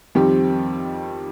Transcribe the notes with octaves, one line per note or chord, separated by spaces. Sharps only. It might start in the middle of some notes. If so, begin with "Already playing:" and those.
F2 D#3 G3 C4 G4